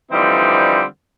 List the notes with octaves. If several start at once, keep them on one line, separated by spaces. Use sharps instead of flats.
D3 E3 F3 G3 C4 D#4